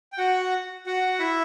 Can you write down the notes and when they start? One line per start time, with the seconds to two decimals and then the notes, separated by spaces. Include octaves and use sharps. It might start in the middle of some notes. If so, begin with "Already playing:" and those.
0.13 G5
0.18 F#4 F#5
0.86 F#4 F#5
1.19 E4 E5